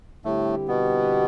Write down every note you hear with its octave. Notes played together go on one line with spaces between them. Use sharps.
A2 D3 G3 A3 C4 E4 G4
B2 B3